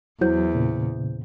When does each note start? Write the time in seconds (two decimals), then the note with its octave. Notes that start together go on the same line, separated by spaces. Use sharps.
0.21 E2 F#3 E4 C5 G6
0.55 A#2 C#3